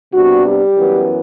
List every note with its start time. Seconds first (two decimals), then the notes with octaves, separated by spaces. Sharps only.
0.12 C3 G3 B3 D4 F#4
0.44 G3 G4
0.75 F#2 E3 B3